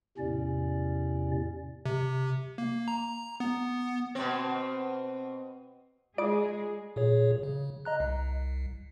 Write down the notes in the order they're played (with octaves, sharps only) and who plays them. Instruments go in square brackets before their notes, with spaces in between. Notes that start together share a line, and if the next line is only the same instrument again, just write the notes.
[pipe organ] E2 A2 C3 C#4 D5
[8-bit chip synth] C3
A#3
A#5
B3
[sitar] B2 C4
[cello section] G#3 G#4 [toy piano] F4 D#6 [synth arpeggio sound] D5 D7
[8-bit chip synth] A#2 G#4 C#5
C#3
D#5 A#5 F#6
C2